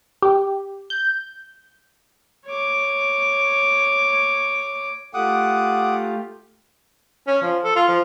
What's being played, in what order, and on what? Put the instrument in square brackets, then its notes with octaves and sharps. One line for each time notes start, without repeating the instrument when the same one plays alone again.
[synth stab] G4
G6
[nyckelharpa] C#5 D6
[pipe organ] A3 F4 G4 [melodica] F#5 D6 D#6
[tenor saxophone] C#4
F3
A4
F4
F3